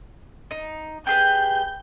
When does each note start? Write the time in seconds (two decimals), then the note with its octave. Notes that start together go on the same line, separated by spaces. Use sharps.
0.51 D#4
1.07 G4 G#4 B4 G6